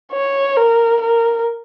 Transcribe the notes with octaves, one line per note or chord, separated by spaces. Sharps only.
C#5
A#4
A#4